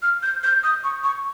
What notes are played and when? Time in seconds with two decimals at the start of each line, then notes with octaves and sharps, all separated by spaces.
0.02 F6
0.23 G6
0.43 G6
0.63 D#6
0.84 C#6
1.04 C#6